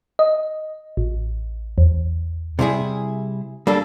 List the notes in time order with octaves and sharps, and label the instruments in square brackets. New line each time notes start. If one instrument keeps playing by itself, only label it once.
[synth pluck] D#5
A1
E2
[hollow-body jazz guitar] C3 G3 E4 G#4
G3 A#3 D4 A4